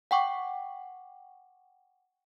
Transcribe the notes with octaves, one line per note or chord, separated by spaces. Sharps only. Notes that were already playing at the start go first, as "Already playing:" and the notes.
F#5 G5 C#6 D6